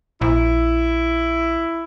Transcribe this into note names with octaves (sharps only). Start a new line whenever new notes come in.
A#1 E4